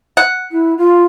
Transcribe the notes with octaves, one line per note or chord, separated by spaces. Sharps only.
F#5
E4
F4